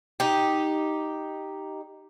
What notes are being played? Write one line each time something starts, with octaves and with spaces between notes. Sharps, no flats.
D#4 G4